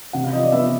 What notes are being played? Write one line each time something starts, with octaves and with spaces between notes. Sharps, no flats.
C3 F#5
F5
F3 D#5
D5
B3 E5